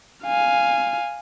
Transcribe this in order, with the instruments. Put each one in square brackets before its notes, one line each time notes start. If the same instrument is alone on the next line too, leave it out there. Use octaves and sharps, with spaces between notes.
[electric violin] F5 G#5